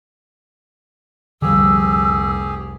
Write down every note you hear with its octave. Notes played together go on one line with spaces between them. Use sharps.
F1 C2 D3 F3 G3 G4 G#4 E6